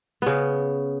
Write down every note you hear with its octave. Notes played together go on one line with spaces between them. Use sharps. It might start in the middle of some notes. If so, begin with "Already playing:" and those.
C#3 B3